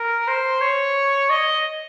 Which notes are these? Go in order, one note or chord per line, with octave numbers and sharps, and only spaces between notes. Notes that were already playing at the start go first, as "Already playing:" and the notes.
Already playing: A#4
C5
C#5
D#5